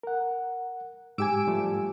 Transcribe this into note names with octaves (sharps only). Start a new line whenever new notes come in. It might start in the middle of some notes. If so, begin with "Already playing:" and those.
A#4 F#5
G#2 G4 G#5 D6 E6 D7
F3 G3 A3